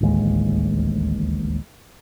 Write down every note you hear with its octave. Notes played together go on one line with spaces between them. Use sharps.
D1 A1 D#2 G#3